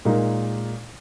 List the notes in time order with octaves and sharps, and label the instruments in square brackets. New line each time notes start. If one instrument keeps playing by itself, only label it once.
[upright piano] A#2 G#3 D#4 A#4